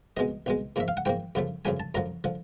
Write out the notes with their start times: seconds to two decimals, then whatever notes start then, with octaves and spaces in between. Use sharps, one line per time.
0.17 C2 B2 G#3 D#5
0.46 C2 B2 G#3
0.76 G#2 F3 A#3 E5
0.88 F5
0.97 F#5
1.05 G#2 F3 A#3 G5
1.35 F#2 C#3 F3 A3
1.65 F#2 C#3 F3 A3 G#5
1.80 A5
1.95 F#2 D3 F3 A#5
2.24 D3 F3